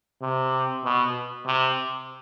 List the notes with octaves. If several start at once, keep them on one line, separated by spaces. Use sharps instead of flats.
C3
B2
C3